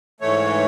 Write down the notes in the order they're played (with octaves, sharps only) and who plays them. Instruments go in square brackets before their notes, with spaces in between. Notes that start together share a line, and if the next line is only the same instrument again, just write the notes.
[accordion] G#2 E3 A3 C#5